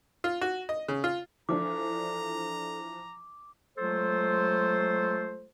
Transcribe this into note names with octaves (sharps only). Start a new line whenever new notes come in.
F4
F#4
D#5
C#3
F4
E3 F3 D4 A4 A#5 D6
F#3 G#3 A3 F4 A4 C5